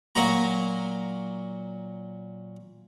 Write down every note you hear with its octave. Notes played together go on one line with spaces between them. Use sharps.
A#2 F#3 F#4 A#5